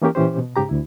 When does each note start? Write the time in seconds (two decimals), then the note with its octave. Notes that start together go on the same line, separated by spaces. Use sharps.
0.02 E3 A#3 C#4 G4 A#4
0.15 A#2 E3 C#4 G4 C5
0.38 B2
0.56 G#2 C#3 G4 A#5
0.69 D2 E4